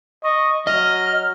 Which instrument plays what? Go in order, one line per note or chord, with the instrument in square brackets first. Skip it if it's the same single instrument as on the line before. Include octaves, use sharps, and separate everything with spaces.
[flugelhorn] D#5 [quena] C#6
[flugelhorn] F#3 [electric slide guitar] D#5 [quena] F6